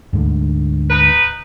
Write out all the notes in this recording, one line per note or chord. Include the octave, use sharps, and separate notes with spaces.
D2 G#2 D3
D#4 B4